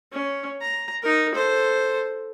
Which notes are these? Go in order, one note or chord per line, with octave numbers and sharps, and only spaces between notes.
C#4
A#5
D#4 A#4
A4 C5